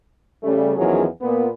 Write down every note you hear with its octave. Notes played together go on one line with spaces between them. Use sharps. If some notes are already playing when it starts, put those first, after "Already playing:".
C#3 G3 A3
E2 D#3 F3 F#3 C#4 G#4
A#2 B3